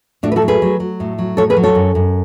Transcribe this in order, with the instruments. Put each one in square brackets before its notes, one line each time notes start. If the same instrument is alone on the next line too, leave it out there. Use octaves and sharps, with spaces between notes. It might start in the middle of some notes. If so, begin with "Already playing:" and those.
[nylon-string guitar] A2 D4 F#4
B4
F#4 A4
F#3
G#4 B4
F#3
F#3
A2
F#3
A2 A4 C#5
G#4 B4
F#3
A4 C#5
F#2
F#2